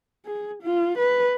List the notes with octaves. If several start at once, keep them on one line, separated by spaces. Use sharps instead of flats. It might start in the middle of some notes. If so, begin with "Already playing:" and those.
G#4
F4
B4